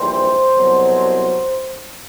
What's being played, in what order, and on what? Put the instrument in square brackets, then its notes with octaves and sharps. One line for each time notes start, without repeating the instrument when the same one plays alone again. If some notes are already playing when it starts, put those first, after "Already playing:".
Already playing: [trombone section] A#1 G#2 E3 G3 C5
C2 B2 F#3